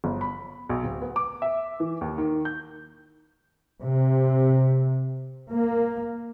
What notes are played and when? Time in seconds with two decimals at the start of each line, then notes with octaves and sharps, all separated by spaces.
0.04 G1
0.21 B5
0.69 B1
0.83 D1
1.02 B3
1.16 D6
1.42 E5
1.80 E3
2.01 D#2
2.18 D#3
2.45 G6
3.82 C3
5.51 A#3